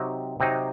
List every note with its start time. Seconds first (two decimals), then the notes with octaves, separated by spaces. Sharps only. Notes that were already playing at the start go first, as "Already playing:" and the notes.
Already playing: C3 F#3 C4 D#4
0.40 C3 F#3 C4 D#4